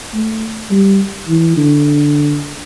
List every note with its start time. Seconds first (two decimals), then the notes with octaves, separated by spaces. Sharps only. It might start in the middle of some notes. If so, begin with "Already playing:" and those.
0.14 A3
0.71 G3
1.29 E3
1.57 D3